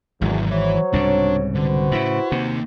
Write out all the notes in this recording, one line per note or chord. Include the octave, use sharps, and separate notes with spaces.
G#1 E2 G#2 F#3
E3 F#3 C5 C#5 E5
C2 G#2 C#3 D4
D3 F#4 B4 C5
A2 C#3 E4
C3 A#3 D#4